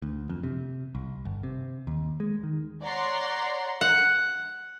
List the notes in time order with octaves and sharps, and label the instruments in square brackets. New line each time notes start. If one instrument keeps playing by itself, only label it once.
[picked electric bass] D2
F2
C3
C2
G1
C3
D#2
G#3
D#3
[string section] C#5 D5 F#5 A#5 C6 C7
[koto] F#5